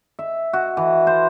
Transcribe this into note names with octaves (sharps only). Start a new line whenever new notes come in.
E5
F#4
E3
C5